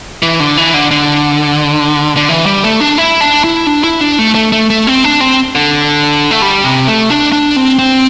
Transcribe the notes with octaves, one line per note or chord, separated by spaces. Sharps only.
E3
D3
E3
D3
D3
D3
E3
G3
A3
D4
E4
D4
E4
D4
E4
D4
A3
A3
A3
A3
C4
D4
C4
D3
A3
G3
C3
A3
D4
D4
C4
C4